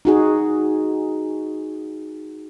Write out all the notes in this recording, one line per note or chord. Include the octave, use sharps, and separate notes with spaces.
D#4 F#4 G#4